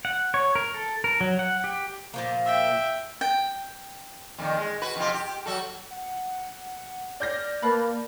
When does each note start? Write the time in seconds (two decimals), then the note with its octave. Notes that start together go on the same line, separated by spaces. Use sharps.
0.05 F#5
0.34 C#5
0.55 A#4
0.74 A4
1.04 A#4
1.21 F#3
1.39 F#5
1.64 G4
2.14 A#2 F3 A#3
2.46 E5 G5
3.21 G5
4.38 F2 A#2 D#3
4.57 G#3
4.81 F#4 B4
4.96 F2 C3 F4
5.14 G4
5.46 F#3 F#4 A4
5.90 F#5
7.20 D5 F6 G6 A#6
7.62 A#3 B4 F5 A5